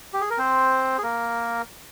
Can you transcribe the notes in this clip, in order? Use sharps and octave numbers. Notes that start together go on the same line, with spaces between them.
G4
G#4
A#4
C4 C5
G#4
A#3 A#4